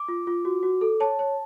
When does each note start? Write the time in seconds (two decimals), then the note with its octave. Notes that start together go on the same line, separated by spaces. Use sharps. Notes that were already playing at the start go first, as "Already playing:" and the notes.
Already playing: D6
0.08 F4
0.27 F4
0.45 F#4
0.63 F#4
0.81 A4
1.00 C#5 A5
1.19 C#5